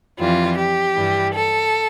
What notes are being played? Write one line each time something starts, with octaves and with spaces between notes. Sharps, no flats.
F2 E3 G3 F4
G4
G2 E3 G3
A4